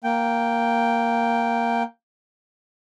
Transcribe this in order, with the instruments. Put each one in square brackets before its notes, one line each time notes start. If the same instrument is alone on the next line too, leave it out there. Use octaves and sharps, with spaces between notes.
[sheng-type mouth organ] A#3 G5